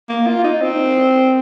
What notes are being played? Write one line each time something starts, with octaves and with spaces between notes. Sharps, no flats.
A#3
F4
D#4
C4